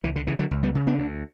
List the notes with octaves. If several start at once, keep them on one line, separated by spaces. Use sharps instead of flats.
C#2 E3
D3
C#3 E3
D3 F#3
C#2
G3 B3
C#3
B3 D4
D2